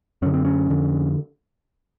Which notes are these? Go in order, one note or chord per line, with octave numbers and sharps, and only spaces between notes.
F#2 D3 C#4
C4
C#4
F2 D3